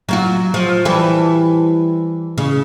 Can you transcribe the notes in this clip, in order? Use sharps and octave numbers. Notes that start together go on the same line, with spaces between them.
F#3 F4 F#4
F3
E3 G3 A4
C#3